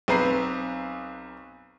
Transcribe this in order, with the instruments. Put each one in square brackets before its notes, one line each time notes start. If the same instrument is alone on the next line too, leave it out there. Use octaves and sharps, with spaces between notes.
[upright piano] B1 C4 B4 A#5 C7